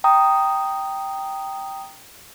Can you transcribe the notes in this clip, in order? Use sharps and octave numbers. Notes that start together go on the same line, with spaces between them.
G5 A#5 D#6